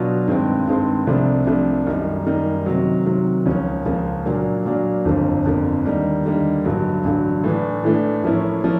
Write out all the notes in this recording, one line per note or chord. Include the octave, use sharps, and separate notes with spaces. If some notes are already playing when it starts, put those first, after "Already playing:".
Already playing: B2 F#3 B3 D4 F4
G2 D#3 G#3 C4
G2 D#3 G#3 C4
C2 C3 F3 A3 D4
C2 C3 F3 A3 D4
F#2 D#3 G3 A#3 D#4
F#2 D#3 G3 A#3 D#4
C3 D#3 F#3
C3 D#3 F#3
C#2 C#3 F3 A#3 C#4
C#2 C#3 F3 A#3 C#4
A#2 F#3 A#3 D4
A#2 F#3 A#3 D4
G1 F2 D3 F3 A#3
G1 F2 D3 F3 A#3
D#2 D3 G3 A#3 D#4
D#2 D3 G3 A#3 D#4
A1 G2 D3 F#3
A1 G2 D3 F#3
A2 E3 A3 D4
A2 E3 A3 D4
A2 F3 A#3 C#4 E4
F3 A#3 C#4 E4